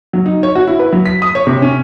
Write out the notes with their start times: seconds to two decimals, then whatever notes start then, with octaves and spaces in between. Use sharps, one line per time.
0.13 F#3
0.26 D#4
0.43 C#5
0.55 F#4
0.67 E4
0.79 B4
0.92 F#3
1.06 B6
1.22 D#6
1.35 C#5
1.47 C3
1.62 C#4